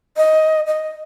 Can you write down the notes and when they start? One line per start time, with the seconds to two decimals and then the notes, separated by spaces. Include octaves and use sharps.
0.17 D#5
0.67 D#5